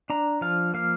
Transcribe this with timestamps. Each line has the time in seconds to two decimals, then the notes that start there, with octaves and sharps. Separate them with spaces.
0.10 D4 A#5
0.41 F3 F5
0.74 A#3 F5